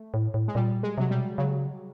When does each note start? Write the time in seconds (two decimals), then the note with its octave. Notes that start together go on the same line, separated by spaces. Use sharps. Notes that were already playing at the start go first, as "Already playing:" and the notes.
Already playing: A3
0.14 A2
0.34 A2
0.48 G#3
0.55 A#2 G3
0.83 G#3
0.98 C3 F#3
1.09 B2 G3
1.20 C3
1.38 C#3 F#3